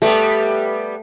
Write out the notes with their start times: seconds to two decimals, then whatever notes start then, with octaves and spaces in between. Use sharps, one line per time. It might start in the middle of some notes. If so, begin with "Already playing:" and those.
0.02 G3 A3 B3 G4